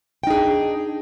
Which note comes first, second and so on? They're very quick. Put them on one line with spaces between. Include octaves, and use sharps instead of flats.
G5 D#4 G#4 D4